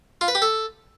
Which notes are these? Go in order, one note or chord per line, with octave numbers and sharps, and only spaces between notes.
F4
B4
G4
A4